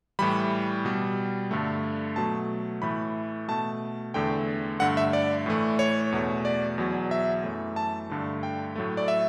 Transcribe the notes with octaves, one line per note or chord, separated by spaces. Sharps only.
A2 E3 G3 B5
B2 G3
G2 D3 A3
B2 F#3 A3 A5
A2 E3 A3 B5
B2 A3 A5
E2 D3 A3 G5
G2 D3 A3 F#5
E5
D5
A2 E3 A3
C#5
E2 B2 A3
D5
E2 B2 F#3
E5
F#2 E3 A3
A5
G2 D3 A3
G5
A2 F#3 A3
D5
E5